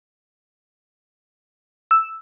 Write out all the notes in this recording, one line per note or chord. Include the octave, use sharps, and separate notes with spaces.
E6